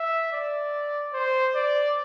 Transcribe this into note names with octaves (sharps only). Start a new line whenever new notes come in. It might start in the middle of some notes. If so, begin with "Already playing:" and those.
Already playing: E5
D5
C5
D5